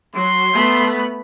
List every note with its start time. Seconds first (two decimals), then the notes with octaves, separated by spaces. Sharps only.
0.15 F#3 C6
0.54 A3 B3 B5